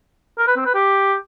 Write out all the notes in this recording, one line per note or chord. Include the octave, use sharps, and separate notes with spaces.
A#4
B4
C4
B4
G4